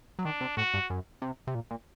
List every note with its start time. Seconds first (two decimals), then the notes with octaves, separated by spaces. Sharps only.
0.19 F#3
0.25 D#3 D4
0.41 C3
0.57 A2 F#4
0.74 G2
0.90 F#2
1.22 C3
1.47 C3
1.55 A#2
1.71 A#2